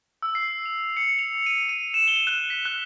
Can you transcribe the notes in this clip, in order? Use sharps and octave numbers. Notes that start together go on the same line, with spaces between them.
E6
C7
F7
C#7
F7
D#7
D#7
E7
G7
F#6
B6
F#6